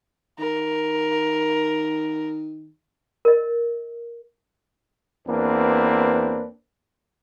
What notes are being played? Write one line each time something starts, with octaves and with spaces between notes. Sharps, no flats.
D#3 A#4
A#4 D#5
E2 A#3 C4 D4 B4